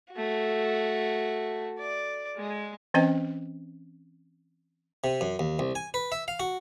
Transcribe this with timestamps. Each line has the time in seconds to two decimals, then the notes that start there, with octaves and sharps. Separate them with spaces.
0.12 A3 F#4
1.79 D5
2.37 G#3
2.94 E3 C4 C#4 C5 D#5 G5
5.04 C3
5.21 F#2
5.39 D#2
5.59 C2
5.75 G#5
5.94 B4
6.12 E5
6.28 F5
6.40 F#4